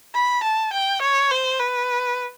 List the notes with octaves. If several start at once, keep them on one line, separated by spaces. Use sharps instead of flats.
B5
A5
G5
C#5
C5
B4